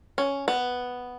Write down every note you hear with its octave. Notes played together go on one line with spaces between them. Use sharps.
C#4
B3